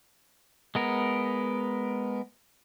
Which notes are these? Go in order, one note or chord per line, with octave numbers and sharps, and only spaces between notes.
G#3 B3 A#4